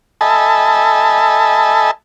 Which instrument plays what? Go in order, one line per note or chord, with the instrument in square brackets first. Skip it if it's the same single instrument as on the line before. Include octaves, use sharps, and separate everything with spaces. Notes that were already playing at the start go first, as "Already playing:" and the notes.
[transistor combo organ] A4 D#5 E5 G#5 A5 B5